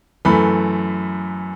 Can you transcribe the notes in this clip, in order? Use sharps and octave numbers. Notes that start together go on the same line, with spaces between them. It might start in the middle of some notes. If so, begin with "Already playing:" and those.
F#2 E3 A3 B5